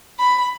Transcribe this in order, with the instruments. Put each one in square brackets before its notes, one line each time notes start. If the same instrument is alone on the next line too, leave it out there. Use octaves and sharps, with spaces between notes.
[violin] B5